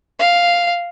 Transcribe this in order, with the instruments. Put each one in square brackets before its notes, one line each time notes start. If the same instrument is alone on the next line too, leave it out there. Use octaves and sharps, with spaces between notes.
[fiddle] F5